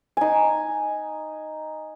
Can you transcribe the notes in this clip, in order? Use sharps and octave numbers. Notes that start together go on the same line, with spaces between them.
D#4 G#5